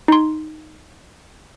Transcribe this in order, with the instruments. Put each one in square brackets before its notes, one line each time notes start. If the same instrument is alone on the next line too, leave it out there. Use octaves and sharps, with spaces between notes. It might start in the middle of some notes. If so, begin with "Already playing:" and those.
[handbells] D#4 C6